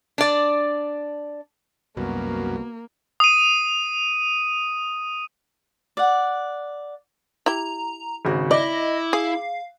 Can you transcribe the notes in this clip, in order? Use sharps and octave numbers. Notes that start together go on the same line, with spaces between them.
D4 D5
C2 F#2 B2 A#3
D#6 D#7
D5 F#5
E4 G4 A#5
G#1 C#3 F#4
E4 D5 D#5 D6
G#4 F5